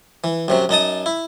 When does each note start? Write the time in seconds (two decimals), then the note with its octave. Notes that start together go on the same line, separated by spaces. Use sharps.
0.24 E3
0.48 F#2 C3 F#3
0.69 F#2 D#4 A5 D#6
1.06 E4